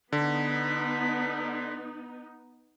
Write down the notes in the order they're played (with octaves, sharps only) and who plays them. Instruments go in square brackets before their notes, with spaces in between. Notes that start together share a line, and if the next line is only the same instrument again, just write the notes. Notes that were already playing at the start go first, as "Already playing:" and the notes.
[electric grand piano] D3 [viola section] B3 D#4 [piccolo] B6